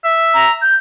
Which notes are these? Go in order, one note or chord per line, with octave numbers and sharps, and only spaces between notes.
E5
A#5
G6